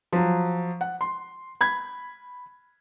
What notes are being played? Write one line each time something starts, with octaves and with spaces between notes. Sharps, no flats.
F3 F#3
F#5
C6
B5 G#6